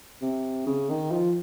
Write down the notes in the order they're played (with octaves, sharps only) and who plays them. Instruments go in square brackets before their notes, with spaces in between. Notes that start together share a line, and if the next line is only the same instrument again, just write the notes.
[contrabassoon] C3
C#3
D#3
F3